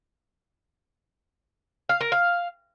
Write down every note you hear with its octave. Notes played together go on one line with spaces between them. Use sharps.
F5
A#4
F5